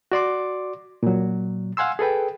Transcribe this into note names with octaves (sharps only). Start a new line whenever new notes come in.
F#4 D5 C6 D6
A#2 F#3
F5 F#5 G#5 C6 E6
G#4 A4 B4 G5